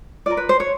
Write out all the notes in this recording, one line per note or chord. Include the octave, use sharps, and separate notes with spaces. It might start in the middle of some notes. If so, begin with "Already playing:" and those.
F4 A#4 D5
B4
C5
C#5